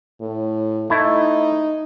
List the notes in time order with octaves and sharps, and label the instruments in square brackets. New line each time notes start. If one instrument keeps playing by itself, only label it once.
[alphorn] A2
[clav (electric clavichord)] A3 E4 [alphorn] D#4